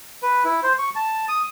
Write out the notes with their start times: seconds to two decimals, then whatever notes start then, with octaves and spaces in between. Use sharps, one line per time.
0.23 B4
0.44 E4
0.63 C5
0.79 C#6
0.96 A5
1.29 D#6